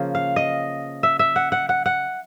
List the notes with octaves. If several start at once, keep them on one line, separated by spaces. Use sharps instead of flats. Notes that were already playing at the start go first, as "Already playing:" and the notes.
Already playing: C#3 F3 A#3
F5
D#5
E5
E5
F#5
F#5
F#5
F#5